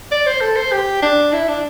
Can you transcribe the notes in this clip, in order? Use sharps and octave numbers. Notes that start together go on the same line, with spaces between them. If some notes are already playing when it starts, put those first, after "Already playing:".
D5
C5
A4
C5
G4
D4
E4
D4